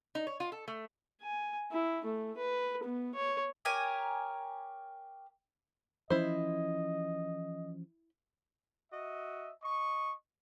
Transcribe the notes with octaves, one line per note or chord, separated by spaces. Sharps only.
D#4
C#5
F4
A4
A3
G#5
E4
A3
B4
B3
C#5
G4 A#4 C#5 G#5
E3 F3 C#4 E4 C5 D#5
F#4 D#5 E5
D#5 C#6